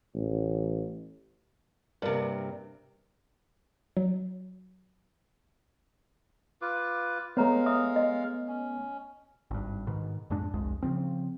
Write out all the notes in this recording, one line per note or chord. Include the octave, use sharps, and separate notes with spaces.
A1
G2 C3 A#3 A#4
F#3
F4 B4 D6
G#3 A3 B3 C#5 F5 A#5
E5 D#6
D#5
C#4
G#1 G2
G#2 B2 D#3
F2 G#2 G#3 D4
G1 C2 F2 G#3
C#3 F3 C4